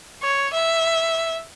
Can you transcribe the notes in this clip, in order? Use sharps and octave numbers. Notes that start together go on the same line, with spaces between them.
C#5
E5